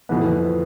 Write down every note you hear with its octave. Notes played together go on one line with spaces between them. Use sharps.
F2 E3 B3